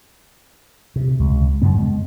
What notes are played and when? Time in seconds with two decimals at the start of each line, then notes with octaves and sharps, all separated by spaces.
0.96 C3
1.20 C#2
1.62 F#2 C#3 B3
1.78 G#3